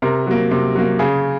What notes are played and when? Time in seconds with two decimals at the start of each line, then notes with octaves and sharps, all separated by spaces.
0.02 C3 A#4
0.27 F#3 A#3
0.51 C3
0.75 F#3 A#3
0.99 C#3 G#4